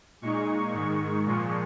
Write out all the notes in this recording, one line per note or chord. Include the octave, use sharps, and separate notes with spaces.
A#2 G#3 D#4 C#6
G#2 D#3 G#3 C#6
A#2 F3 G#3